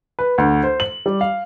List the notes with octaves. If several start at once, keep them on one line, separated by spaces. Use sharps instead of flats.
B4
D2
C5
F#7
G3
F5